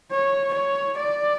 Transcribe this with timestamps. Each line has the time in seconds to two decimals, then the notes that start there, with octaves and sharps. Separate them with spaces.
0.11 C#5
0.53 C#5
0.97 D5